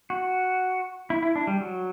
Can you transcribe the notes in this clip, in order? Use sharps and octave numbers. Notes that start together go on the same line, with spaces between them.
F#4
E4
E4
D4
G3
F#3